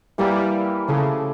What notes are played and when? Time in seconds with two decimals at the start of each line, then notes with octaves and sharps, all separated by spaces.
0.18 E3 G3 A#3 E4 G4
0.88 C#3 F3 A3 E4